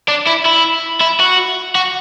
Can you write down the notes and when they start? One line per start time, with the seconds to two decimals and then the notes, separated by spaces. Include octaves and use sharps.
0.08 D4
0.27 E4
0.46 E4
1.01 E4
1.20 F#4
1.75 F#4